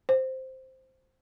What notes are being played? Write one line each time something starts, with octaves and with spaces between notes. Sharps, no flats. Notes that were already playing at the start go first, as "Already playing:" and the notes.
C5